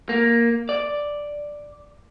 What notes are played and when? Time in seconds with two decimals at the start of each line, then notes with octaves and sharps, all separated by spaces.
0.09 A#3
0.69 D5